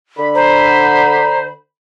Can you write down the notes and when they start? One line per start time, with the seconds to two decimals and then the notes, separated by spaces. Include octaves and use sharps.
0.18 D3 B5
0.35 C5 A#5